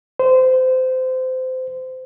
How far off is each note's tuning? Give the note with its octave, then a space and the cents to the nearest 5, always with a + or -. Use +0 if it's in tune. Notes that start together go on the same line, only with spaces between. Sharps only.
C5 -25